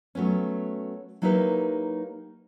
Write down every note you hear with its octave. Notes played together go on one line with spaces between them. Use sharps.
F#3 A3 B3 C#4
F#3 A#3 D#4 E4 G4 B4